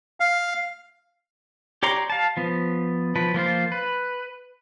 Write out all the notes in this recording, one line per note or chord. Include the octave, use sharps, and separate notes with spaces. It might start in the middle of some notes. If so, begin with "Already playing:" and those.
F5
G4 C#5 D5 A#5 C6
F5 A5
F3 B3
F3 B4
F3 A#3 F4 C5
B4